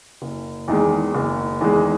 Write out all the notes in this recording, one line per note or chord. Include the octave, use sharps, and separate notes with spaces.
F#1
E2 D#3 G#3
F#1
E2 D#3 G#3